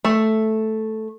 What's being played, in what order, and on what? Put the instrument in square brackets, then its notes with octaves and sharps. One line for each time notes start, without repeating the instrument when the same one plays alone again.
[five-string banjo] A3